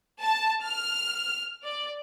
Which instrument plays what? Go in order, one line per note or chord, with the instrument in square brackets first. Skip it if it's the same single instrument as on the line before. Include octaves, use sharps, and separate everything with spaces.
[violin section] A5
F6
D5